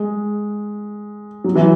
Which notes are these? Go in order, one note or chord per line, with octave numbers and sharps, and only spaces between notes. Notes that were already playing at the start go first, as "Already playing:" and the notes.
Already playing: G#3
F#3
E3